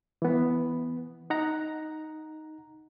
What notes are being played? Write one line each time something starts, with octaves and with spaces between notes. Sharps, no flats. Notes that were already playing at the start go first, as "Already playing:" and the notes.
E3 B3
D#4 F#5 A#5